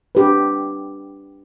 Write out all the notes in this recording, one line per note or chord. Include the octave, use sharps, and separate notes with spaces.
D4 G4 B4